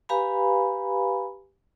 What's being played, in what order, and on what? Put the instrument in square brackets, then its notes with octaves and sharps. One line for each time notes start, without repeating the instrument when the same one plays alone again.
[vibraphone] G4 B4 F5 G#5 A#5 B5